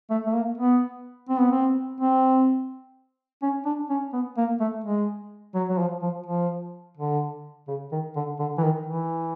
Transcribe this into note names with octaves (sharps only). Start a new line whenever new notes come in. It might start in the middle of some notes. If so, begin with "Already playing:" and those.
A3
A3
A#3
B3
C4
B3
C4
C4
C#4
D4
C#4
B3
A#3
A3
G#3
F#3
F#3
F3
F3
F3
D3
C#3
D#3
D3
D3
E3
D#3
E3